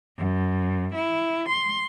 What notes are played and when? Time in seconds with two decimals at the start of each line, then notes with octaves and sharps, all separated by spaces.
0.17 F#2
0.94 E4
1.48 C6